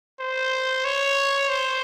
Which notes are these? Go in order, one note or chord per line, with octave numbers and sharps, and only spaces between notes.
C5
C#5
C5